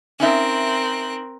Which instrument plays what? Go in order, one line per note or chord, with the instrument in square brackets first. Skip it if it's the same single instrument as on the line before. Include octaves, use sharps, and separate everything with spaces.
[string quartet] C4 A#4 F#6 [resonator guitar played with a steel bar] C#4 D#4 E5